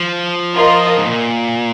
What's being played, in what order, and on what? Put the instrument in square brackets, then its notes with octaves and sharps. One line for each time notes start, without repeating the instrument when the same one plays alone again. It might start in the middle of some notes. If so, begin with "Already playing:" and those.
Already playing: [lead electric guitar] F3
[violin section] F4 A#4 D#5
[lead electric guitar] G#2
A#2